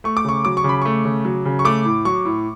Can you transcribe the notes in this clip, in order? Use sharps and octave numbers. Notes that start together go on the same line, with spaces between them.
A3 C#6
D6
C#3 C#6
F#3 D6
C#6
C#3
B5
A3 C#6
C#3
F#3
C#3
C#6
A3 D6
A2
F#3 C#6
A2